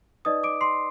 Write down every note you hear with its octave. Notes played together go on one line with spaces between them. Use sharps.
D#4 B4 D5 D#5 D#6
D6 D7
C6 C7